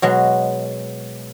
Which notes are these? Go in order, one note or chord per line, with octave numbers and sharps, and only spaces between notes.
B2 F#3 G#3